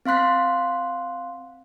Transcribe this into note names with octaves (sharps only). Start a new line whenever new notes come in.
C4 F5 C6 F#6 B6